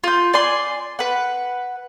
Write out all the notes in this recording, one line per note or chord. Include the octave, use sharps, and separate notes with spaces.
F4 G6
D5 G#5 C6
B4 F#5